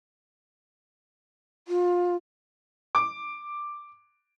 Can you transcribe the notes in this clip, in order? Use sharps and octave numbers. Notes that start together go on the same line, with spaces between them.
F4
D6